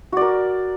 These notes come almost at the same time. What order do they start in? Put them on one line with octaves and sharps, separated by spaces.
F#4 D5 A#4